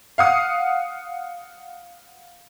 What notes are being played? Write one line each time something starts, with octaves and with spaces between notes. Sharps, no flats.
F5 F#5 D#6